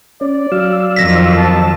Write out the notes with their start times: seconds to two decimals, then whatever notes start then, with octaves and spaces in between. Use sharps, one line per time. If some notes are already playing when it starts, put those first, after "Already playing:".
0.21 C#4 D5
0.52 F#3 F5 E6
0.96 F2 D#3 A#6 B6
1.37 A5